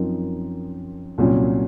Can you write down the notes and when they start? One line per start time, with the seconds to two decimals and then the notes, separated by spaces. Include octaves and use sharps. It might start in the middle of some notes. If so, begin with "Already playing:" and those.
Already playing: F#2 F3 C4 D#4 A#4
1.18 C2 A#2 F#3 C#4